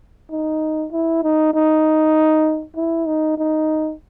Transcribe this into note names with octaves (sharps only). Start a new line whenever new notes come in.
D#4
E4
D#4
D#4
E4
D#4
D#4